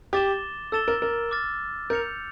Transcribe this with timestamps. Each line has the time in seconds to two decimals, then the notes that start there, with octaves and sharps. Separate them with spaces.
0.13 G4 D6 A6 E7 G7
0.72 A4 E6 A6 E7 G7
0.88 A#4
1.02 A#4
1.31 D6 F6 A6
1.90 A#4 G6 C#7 F7